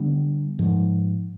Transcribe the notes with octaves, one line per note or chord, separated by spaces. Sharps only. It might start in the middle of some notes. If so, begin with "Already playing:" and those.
Already playing: D3 G3 B3 D4
G#2 F3 G#3